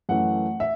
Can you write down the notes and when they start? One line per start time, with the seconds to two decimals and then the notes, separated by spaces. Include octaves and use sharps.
0.09 F#2 E3 A3 F#5
0.60 E5